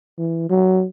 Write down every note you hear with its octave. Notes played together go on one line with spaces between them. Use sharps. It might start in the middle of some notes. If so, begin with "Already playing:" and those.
E3
F#3